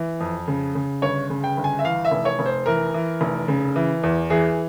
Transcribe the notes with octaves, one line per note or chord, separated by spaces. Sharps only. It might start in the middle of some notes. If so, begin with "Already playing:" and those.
Already playing: E3
F2
C#3
C#3
G1 C#5
C#3
G5
G1
G#5
E5
E3 F5
E5
F1
C#5
F1
C5
E3 A#4
E3
F1
C#3
E3
E2
E3 G#4